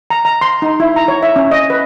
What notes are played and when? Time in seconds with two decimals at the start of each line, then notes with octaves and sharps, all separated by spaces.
0.10 A#5
0.25 A#5
0.41 C6
0.62 D#4
0.80 E4
0.96 A#5
1.08 C#5
1.23 E5
1.36 C#4
1.51 D#5
1.70 B4